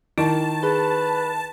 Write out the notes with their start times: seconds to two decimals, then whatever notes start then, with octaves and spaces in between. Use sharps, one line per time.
0.18 D#3 E4 A5
0.63 G#4 B4